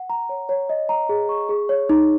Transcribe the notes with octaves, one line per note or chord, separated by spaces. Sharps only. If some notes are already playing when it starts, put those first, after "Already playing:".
Already playing: F#5
A#5
C#5
C#5
D#5
A#5
G#4
C#6
G#4
C#5
D#4